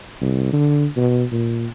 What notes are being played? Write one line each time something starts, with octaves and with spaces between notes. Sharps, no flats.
C2
D3
B2
A#2